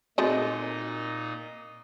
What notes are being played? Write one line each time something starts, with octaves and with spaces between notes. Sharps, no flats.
A#2 G#3 A3 C4 D#4 F#4 D#5